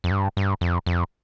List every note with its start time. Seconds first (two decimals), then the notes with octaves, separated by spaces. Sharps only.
0.04 F2
0.11 G2
0.37 G2
0.61 F2
0.86 F2